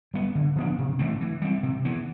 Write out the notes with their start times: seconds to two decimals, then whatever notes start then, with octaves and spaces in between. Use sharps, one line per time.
0.14 G3 B3
0.35 D3
0.56 F3 B3 D4
0.78 C3
0.99 E3 A3 C4
1.21 E3
1.42 G3 C4
1.63 C3
1.85 E3 B3